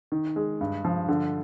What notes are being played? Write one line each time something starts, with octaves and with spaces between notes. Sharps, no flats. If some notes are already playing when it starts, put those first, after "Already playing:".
D#3
G#3
G2
F3
D3